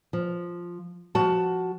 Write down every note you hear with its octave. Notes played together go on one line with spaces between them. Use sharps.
F3
F3 F#4 A5